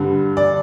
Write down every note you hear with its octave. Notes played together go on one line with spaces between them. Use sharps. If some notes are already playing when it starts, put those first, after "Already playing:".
Already playing: G2 D3 G3
D5